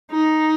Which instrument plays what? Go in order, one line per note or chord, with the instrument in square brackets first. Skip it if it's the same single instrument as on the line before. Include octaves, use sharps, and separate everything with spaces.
[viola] D#4